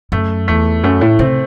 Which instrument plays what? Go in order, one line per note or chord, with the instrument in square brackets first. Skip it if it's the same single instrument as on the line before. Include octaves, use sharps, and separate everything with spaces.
[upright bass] F#2 [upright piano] A3
[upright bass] E2 [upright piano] A3
[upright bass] F#2 [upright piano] A3
[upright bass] A2
[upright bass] C3 [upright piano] C4